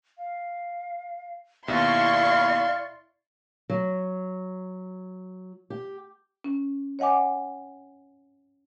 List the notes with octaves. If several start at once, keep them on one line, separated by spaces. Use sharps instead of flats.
F5
D#2 B2 E4 D5 E5 F5 C6 C#6
F#3
G4
C#4
C#5 D#5 F#5 G#5 D6